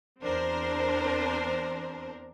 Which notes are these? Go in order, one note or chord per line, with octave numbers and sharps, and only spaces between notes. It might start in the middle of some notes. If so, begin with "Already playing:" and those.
E2 C4 D4 A#4 C5